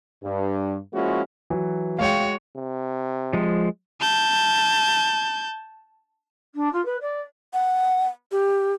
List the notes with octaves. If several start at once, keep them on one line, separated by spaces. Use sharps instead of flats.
G2
F3 G#3 A#3 C#4 E4 F#4
E3 F#3
G#3 F#4 C#5 F5 G5
C3
F3 G#3
A5 G6
D4
F4
B4
D5
F#5
G4